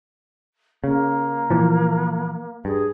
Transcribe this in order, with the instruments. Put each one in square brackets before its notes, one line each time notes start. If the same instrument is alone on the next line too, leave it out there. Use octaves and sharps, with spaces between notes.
[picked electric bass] C#3 [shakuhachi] A#3
[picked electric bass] A#2 E3 F3
[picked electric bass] G2 [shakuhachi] G#4